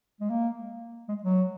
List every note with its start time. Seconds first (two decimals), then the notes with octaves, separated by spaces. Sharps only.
0.20 G#3
0.30 A#3
1.08 G#3
1.23 F#3